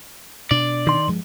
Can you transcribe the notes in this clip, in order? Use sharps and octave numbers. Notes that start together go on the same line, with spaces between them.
B2 D4 D5
D#3 C6
G2 F3 G#3